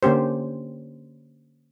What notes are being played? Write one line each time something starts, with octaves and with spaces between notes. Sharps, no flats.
D3 A#3 C#4 G4 C5